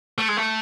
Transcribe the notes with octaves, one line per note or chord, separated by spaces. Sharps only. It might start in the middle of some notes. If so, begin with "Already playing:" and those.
A3
G#3
A3